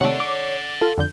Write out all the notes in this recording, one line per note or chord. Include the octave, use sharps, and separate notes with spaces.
C3 D#3 A3 C#5 D5 F#5
D6
F4 A4
F2 D3 G6